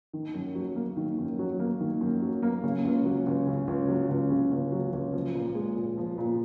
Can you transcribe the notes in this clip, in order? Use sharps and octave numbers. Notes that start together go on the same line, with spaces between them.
D#3
F#2
F#3
A#3
D#3
F#2
F#3
A#3
D#3
F#2
F#3
A#3
C#3
C#2
F#3
C#2
C#3
C#2
F#3
C#2
C#3
C#2
F#3
C#2
F3
A#2
G#3
A#2
F3
A#2